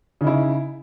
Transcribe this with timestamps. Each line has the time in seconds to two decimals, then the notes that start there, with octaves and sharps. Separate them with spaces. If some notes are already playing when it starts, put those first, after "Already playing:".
0.21 C#3
0.24 D#4
0.27 E4